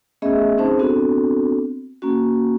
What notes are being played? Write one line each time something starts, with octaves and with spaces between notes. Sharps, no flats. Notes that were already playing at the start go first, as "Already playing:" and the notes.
A3 B3 C#4 G#4 D#5 E5
C4 C#4 D#4 G#4 C5 A5
B3 C4 D4 F#4 A4
A#3 C#4 F#4